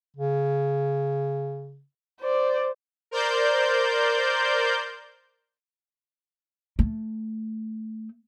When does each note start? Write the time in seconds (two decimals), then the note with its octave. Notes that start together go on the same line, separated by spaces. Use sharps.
0.16 C#3
2.21 C5 D5
3.11 A#4 C5 D5 G6
6.79 A3